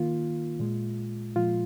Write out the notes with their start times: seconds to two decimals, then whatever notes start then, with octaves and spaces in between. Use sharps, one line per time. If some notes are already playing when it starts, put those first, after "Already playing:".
Already playing: D#3 A#3 F4
0.60 A#2 G#3
1.35 A#2 F3 G#3 F4